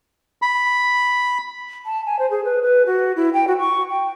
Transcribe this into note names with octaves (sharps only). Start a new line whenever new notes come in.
B5
A5
G#5
C5
G#4
B4
B4
F#4
E4
G5
F#4
C#6
G5